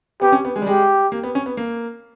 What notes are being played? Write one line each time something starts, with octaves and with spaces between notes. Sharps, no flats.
B3 G4
C#4
B3
G#3
G3
G#3 G4
A#3
B3
C#4
B3
A#3